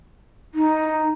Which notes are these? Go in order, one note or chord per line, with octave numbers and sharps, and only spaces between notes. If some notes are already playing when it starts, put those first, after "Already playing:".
D#4